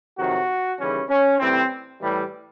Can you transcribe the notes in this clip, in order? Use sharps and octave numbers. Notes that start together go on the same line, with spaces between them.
F2 C3 D#3 F#3 F#4
D#2 C#3 E3 G3 C#4
C#4
A2 E3 G3 C4
A2 E3 G3